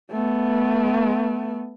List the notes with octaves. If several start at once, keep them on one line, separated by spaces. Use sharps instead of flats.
A3 B3